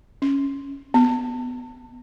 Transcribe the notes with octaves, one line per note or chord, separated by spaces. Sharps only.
C#4
B3